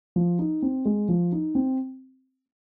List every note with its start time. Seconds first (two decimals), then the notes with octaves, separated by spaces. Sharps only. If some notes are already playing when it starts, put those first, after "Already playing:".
0.16 F3
0.39 D#4
0.62 C4
0.85 G#3
1.09 F3
1.32 D#4
1.55 C4